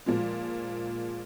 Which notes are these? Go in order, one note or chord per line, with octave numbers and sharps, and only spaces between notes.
A#2 F3 G#3